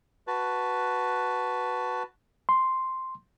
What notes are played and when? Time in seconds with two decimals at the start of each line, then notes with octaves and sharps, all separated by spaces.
0.27 F#4 B4 A5
2.49 C6